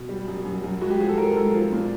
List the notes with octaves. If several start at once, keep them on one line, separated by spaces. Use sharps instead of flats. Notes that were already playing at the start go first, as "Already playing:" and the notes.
Already playing: B2
G3
F#2
F#2
F#2
G#3 F#4
G4
F3 G#4
A4
G#2 A#4
G#3 A4
F3
A#2